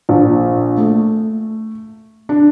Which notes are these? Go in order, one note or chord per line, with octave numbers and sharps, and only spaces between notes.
A#1
A3
D4